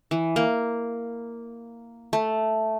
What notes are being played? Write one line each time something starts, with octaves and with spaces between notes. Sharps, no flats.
E3
A#3
A3